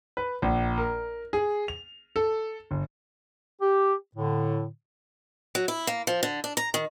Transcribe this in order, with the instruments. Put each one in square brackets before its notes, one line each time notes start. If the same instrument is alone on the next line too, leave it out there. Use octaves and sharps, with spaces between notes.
[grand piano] B4
A#1
A#4
G#4
F7
A4
G1
[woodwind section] G4
A2 D3
[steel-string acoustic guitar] F#3
E4
A#3
F3
D3
D4
A#5
D#3